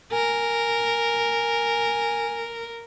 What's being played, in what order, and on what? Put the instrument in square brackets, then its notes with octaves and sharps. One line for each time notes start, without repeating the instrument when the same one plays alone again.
[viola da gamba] A#4 [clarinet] G#5